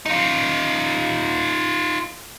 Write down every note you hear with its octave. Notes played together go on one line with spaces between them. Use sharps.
D#4 F4